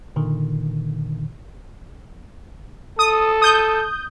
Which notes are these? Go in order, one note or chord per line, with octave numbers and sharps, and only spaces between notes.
A#2 D3 D#3
A4 D#6
D#6 G6